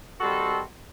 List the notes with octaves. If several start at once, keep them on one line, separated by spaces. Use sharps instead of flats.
D#3 G3 C4 F#4 A4